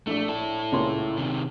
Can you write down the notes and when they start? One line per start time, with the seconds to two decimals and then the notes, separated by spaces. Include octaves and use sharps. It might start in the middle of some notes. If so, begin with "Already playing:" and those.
0.07 A#1 A3 D4
0.29 E4 A4
0.72 C#2 A#2 C6
1.18 C3 D#3